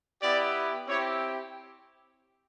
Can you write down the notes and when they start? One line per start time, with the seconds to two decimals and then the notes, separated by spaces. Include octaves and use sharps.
0.21 B3 E4 G4 D5
0.88 C4 E4 G4 C#5